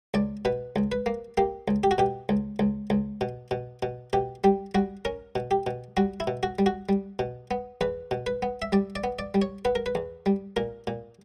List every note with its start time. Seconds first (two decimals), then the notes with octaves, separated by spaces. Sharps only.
0.14 C#2 D5
0.45 B2 B4
0.76 C#2
0.92 B4
1.06 A#3
1.37 A#3 G4
1.68 C#2
1.84 G4
1.91 F#4
1.98 B2 G4
2.29 C#2
2.59 C#2
2.90 C#2
3.21 B2
3.51 B2
3.83 B2
4.13 B2 G4
4.44 G3 G4
4.75 G3 F#4
5.05 C#4 A#4
5.35 B2
5.51 G4
5.67 B2
5.97 G3 F#4
6.20 E4
6.27 B2
6.43 F#4
6.59 G3
6.66 F#4
6.89 G3
7.19 B2
7.51 B3
7.81 E2 B4
8.11 B2
8.27 B4
8.42 B3
8.62 E5
8.72 G3 D5
8.95 D5
9.04 B3
9.19 D5
9.34 G3
9.42 C#5
9.65 B3 B4
9.75 A#4
9.86 B4
9.95 E2
10.26 G3
10.56 A#2 A#4
10.87 A#2